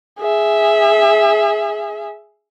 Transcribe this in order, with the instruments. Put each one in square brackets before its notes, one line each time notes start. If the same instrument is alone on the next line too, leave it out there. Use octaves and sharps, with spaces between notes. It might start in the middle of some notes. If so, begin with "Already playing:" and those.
[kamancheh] G#4 E5